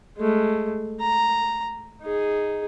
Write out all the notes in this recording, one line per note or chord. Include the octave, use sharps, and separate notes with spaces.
G#3 A3
A#5
D#4 G#4